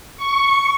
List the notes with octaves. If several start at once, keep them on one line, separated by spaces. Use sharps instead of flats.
C#6